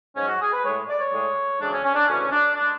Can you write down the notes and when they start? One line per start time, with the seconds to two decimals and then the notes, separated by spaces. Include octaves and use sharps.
0.16 G#2 F#3 C#4
0.28 F#4
0.41 G#4
0.53 B4
0.64 A2 G#3 C#5
0.89 D5
1.00 C#5
1.13 A2 G#3
1.60 D2 C#3 E3 G#3 D4
1.72 C#4
1.85 C#4
1.95 D4
2.07 D2 C#3 E3 C#4
2.32 D4
2.56 G#3 D4